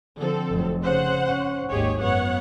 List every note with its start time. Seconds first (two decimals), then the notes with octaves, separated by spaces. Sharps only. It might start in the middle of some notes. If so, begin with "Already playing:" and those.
0.18 D3 F3 C4 A4
0.50 F1 F#3
0.82 C#3 C5 F#5
1.26 C#4
1.70 G#1 D#2 G4 G#4 C#5
2.00 F#2 B3 C#5 F#5